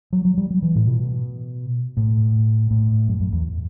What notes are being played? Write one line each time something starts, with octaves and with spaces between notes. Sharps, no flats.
F#3
F#3
G3
F#3
E3
A2
B2
A2
A2
F#2
F#2
E2